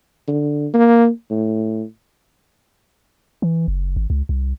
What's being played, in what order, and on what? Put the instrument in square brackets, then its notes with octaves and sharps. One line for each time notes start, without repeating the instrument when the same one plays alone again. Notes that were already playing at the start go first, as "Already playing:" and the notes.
[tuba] D3
A#3
A2
[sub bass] E3
F#1
G#1
C#2
C2